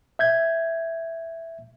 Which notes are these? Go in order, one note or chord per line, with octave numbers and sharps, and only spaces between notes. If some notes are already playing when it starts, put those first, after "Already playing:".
E5 G6 G#6